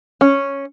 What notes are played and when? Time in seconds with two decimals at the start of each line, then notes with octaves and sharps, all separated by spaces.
0.21 C#4